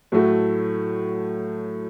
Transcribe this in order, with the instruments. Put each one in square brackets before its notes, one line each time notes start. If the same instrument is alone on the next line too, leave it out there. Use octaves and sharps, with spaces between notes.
[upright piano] A2 F#3 A3 F#4